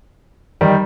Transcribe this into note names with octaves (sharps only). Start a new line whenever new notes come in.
D#3 G3